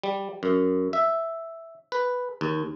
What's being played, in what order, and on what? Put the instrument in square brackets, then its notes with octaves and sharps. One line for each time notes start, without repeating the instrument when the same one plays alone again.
[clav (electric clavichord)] G3
F#2
E5
B4
D#2